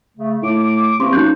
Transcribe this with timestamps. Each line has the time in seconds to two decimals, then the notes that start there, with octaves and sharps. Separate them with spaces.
0.16 C#3 A3
0.42 A2 D6
1.00 C3 E3 A#3 C6 C#6
1.13 F#2 D#4 F#4 F#6 G6